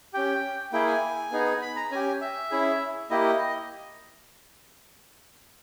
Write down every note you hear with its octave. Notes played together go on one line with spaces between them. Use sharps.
C#4 G4 G5
A#3 E4 G#4 G5
G#5
B3 D#4 G#4
B5
A#5
C#4 G4 G#5
E5
C#4 E4 G#4
A#3 E4 G4 D#5